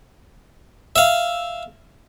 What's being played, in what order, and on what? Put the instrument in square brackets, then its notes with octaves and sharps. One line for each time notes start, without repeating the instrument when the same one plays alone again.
[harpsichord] E5 F5